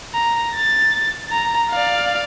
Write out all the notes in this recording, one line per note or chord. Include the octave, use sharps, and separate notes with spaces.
A#5
A6
A#5
D5 F5